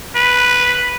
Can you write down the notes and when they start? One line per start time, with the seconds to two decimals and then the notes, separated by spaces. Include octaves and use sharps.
0.15 B4